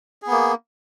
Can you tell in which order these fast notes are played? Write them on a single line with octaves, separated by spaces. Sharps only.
G#4 B3 A#3